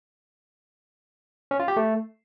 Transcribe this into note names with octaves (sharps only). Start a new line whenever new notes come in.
C#4
F4
G4
A3